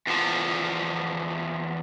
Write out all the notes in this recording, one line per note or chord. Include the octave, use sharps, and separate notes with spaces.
E2 F3